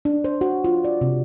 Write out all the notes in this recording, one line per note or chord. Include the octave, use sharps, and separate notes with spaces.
D4
C5
F#4
F4
D5
C3